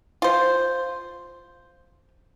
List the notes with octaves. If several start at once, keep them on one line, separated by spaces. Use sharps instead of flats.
F4 C5